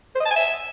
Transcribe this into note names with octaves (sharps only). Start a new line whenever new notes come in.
C5
D#5
A5
G#5
E5